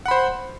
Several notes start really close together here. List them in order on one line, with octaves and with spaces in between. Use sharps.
F#5 B5 C5